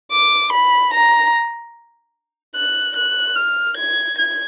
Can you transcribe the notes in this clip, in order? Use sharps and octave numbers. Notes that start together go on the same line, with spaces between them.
D6
B5
A#5
F#6
F#6
F6
G#6
G#6